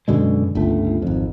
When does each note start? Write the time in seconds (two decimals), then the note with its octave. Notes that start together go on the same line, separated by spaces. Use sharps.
0.08 F#2 B2 D3 G#3
0.55 G1 C#2 A3
1.02 G#1 F2